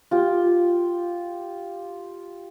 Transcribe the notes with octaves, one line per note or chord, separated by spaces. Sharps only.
F4 G4